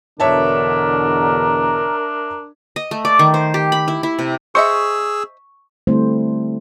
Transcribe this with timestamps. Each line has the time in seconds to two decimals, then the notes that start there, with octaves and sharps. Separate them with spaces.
0.20 E2 B2 D3 D4 A#4 C#5 E5 A5
2.76 D#5
2.91 A3
3.05 D5
3.19 D#3
3.34 C5
3.54 G4
3.72 B5
3.88 E4
4.03 E4
4.19 C3
4.55 G#4 C5 D#5 E5 C#6 E6
5.87 D3 G3 A3 C4 E4 C5